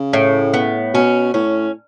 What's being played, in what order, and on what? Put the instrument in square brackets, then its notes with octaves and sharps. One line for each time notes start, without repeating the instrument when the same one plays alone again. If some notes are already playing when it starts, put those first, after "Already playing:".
Already playing: [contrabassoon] C#3
[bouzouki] A2
B3
[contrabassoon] B2 [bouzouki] C#4
[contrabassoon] A2 [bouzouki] C#4